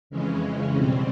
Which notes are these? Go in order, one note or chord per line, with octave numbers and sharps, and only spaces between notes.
F2 C#3 E3 G#3 C#4
B2 G3 C4